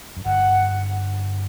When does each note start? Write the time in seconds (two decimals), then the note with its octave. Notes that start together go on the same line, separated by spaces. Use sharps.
0.17 F#2
0.25 G1 G2 F#5